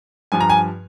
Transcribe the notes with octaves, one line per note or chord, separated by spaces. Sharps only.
G2 F3 G#5
A#5
G#5